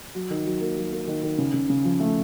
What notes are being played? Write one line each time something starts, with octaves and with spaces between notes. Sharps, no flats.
F#3
D#3
F#3
A#3
F#3
A#3
D#3
D#3
C#3
C#3
C#3
F3
A3